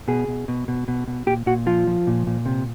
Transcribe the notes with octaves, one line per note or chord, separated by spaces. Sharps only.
B2 G#4
B2
B2
B2
B2
B2
A#2 G4
A#2 F#4
F3 F4
F3
A#2
A#2
C3